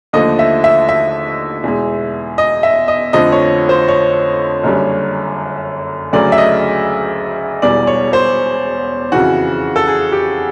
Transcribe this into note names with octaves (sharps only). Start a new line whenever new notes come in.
D#2 D3 F3 A3 D#5
E5
E5
E5
E2 B2 G#3
D#5
E5
D#5
F2 D3 F3 A3 D#5
C#5
C5
C#5
F#1 F#2 D3 G3
D2 C#3 F#3 A3 D5
E5
D#5
E1 E2 B2 G3 D5
C#5
C5
F2 C#3 E3 F#4
A4
G#4
G4